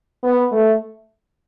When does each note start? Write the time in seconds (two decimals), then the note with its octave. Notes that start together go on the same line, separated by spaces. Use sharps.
0.24 B3
0.52 A3